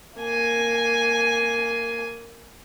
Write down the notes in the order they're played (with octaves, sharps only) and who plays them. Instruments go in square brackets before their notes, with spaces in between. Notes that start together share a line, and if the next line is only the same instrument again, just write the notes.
[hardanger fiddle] A#3 G#5